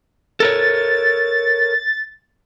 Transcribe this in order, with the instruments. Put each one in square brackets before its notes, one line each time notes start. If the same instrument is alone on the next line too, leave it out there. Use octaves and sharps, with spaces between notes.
[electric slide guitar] A4 A#4 C#5 [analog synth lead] A6